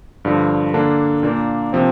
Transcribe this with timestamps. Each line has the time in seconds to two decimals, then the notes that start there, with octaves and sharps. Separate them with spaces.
0.25 G2 D3 F3
0.74 D3 A#3 D4
1.23 A#2 A#3 D4
1.73 C3 F3 C4